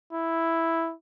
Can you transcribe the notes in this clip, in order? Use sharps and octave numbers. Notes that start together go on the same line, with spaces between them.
E4